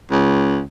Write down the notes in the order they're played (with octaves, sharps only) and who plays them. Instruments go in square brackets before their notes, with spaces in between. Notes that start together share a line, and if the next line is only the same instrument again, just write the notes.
[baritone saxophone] C#2